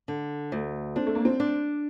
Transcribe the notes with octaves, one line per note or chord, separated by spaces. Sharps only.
D3
D2
C4 D4
A3
A#3
C4
D4